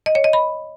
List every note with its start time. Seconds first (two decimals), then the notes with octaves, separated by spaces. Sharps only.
0.06 D#5
0.15 C#5
0.24 D#5
0.33 B5